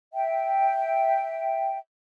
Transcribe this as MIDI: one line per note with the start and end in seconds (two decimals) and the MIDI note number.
0.13 1.77 76
0.13 1.77 79